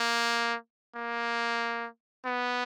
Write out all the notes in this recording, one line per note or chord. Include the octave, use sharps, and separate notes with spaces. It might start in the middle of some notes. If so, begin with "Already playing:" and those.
Already playing: A#3
A#3
B3